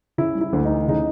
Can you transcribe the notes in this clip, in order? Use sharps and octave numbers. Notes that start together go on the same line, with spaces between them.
C#3 E4
G3
E4
D2
D#4
E3
C#3 D#4